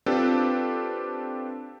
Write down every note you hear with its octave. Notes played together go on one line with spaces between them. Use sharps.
C4 D4 F4 G4 A4 B4